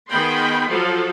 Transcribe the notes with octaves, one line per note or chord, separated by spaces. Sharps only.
D#3 B3 G#4 G5 B5 C6
F3 F#3 F4 A4